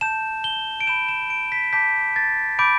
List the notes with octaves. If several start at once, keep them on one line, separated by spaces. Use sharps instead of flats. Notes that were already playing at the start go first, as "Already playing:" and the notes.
A5 G6 E7
G7
D7
B5 G6 E7
E7
D7
B6
A5 D6 G6 B6
A6
B5 D6 G6 D7